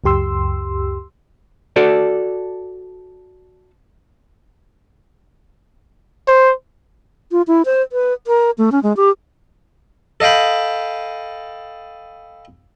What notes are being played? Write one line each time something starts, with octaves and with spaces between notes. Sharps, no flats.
C#2 F#2 G4 C6 E6
F#4 A4 D5
C5
F4
E4
C5
B4
A#4
A3
C#4
G#3
G4
A4 D#5 F5 G5 B5